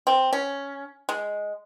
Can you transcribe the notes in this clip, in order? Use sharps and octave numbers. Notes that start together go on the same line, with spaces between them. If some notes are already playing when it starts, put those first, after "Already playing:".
C4
C#4
G#3